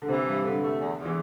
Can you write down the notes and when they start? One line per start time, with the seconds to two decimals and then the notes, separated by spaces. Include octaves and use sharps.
0.02 D3
0.08 C3 E3
0.26 G2
0.43 D3 E3
0.60 A3
0.78 E2
0.96 E2
1.05 E3